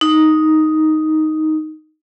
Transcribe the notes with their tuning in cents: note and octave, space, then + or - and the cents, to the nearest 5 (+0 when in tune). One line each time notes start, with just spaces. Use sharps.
D#4 +5